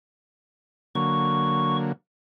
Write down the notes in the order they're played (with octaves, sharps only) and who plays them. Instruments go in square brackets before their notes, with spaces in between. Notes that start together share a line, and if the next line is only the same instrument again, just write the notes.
[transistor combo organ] D3 F#3 A#3 [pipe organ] C#6